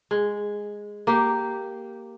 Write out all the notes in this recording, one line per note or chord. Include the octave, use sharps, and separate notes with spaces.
G#3
A#3 G4